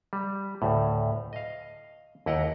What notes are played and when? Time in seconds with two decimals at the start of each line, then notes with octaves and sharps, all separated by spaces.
0.13 G3
0.62 D2 A2
1.33 D#5 F5
2.26 D#2 E4 D#5 F#5 G5 A#5